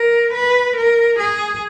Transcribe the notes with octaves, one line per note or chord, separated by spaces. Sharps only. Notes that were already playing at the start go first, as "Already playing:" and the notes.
Already playing: A#4
B4
A#4
G#4